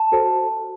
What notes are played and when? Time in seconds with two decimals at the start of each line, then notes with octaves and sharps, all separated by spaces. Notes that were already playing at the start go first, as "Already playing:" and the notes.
Already playing: A5
0.12 F#4 A4 C5